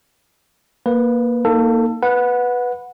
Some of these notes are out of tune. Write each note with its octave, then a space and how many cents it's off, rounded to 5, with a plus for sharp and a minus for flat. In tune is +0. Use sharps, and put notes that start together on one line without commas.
A#3 +10 B4 +0
A#3 +0 D#4 +10 A4 +20
B4 +0 F#5 -20